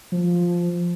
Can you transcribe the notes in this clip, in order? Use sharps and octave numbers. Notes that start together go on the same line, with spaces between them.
F3